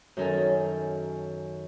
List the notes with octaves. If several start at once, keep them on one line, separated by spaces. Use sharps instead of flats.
F#2 D#3 C#4 A4 A#4 G#5